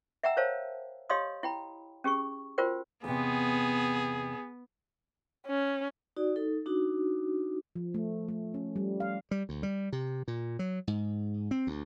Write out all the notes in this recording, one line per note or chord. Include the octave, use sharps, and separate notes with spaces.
E5 F#5 G5 A#5 E6
A#4 C5 C#5 F5 A5
G4 C#5 D#5 F5 C6 D#6
E4 G5 B5
C#4 G4 G#4 C#6
F4 F#4 A#4 C5 G5
E2 C3 B3 G#4
C#4
D#4 F#4 D5
D#4 A4
D4 D#4 F#4
F3
A3
A3
C#4
G3
F5
G3
D2
G3
C3
A#2
F#3
G#2
C4
D2